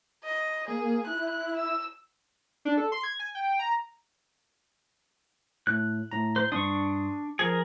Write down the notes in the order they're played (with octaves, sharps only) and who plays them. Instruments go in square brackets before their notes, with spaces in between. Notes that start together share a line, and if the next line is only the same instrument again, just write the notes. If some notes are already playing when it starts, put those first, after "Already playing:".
[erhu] D#5
[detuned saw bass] A#3 [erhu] G#4
[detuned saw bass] E4 [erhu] F#6
[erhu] E6
[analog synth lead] D4
A4
C6
G#6
G#5
G5
A#5
[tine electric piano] A2 [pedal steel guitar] F#6
[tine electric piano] A2 A#5
[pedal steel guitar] C5
[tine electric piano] G2 C6 D#6 [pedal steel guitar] D4 C#6
[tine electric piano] F3 [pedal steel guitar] G#4 A#4